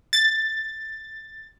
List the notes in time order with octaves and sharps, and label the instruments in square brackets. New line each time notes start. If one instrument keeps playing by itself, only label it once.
[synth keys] A6